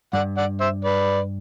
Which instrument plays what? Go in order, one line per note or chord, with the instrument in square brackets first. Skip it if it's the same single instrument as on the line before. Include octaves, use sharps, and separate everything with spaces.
[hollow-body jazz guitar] G2 [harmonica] D5 F#5
[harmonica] D5 F#5
C5 E5
B4 D5